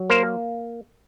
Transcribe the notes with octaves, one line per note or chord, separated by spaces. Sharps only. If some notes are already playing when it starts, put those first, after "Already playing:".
Already playing: F#3
A#3 A#4 C5